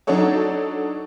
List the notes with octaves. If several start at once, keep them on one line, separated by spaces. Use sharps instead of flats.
F#3 D4 D#4 F#4 A4 C#5